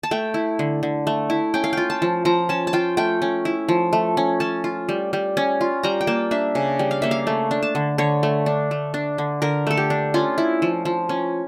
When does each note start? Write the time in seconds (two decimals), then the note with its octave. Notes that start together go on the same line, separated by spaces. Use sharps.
0.03 A5
0.11 A3 G5
0.34 E4
0.59 D3
0.83 D3
1.07 A3
1.30 E4
1.54 C#4 G5
1.64 F5
1.73 F4 G5
1.90 A5
2.02 F3
2.25 F3 A#5
2.49 C#4 A5
2.67 A5
2.73 F4 G5
2.97 A3 G5
3.22 C#4
3.45 E4
3.69 F3
3.93 A3
4.17 C#4
4.40 C#4 A5
4.64 F4
4.89 G3
5.13 G3
5.37 C#4
5.61 F4
5.83 G3 A#5
6.01 G5
6.07 A#3 A5
6.31 D4 E5
6.55 C#3
6.79 G3
6.91 F5
7.02 A#3 E5
7.11 F5
7.27 A3
7.51 D4
7.63 A5
7.75 D3
7.98 D3 C#5
8.23 A3
8.46 D4
8.71 A3
8.94 D4
9.18 D3
9.42 D3 A#4
9.67 A3 A4
9.77 G4
9.90 D4
10.14 C#4 F4
10.38 E4
10.62 F3
10.85 F3
11.09 C#4